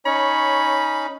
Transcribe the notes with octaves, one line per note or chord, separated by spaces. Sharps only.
C#4 D#4 C#5 B5